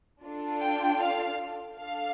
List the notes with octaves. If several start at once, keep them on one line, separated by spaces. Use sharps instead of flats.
D4 F4 A4
G5
F5
D4 A4 F5